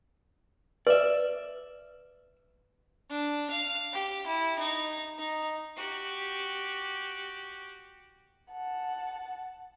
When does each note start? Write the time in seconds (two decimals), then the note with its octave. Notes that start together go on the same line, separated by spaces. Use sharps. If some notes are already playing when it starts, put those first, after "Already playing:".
0.87 B4 D5 E5
3.10 D4
3.51 F5
3.93 G4
4.27 E4
4.59 D#4
5.19 D#4
5.77 F#4 G4
8.51 F#5 A5